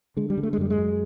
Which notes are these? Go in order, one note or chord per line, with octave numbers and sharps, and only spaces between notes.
D3 G#3
G3
D3
A3
G#3
F#2 G3
G#3
F#2